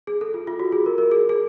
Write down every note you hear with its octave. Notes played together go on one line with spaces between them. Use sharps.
G#4
A4
F4
F4
F#4
G#4
A#4
A#4
G#4
G#4